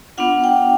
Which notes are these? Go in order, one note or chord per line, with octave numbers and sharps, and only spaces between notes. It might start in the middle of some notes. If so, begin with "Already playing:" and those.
B3 D4 F4 F#5
G5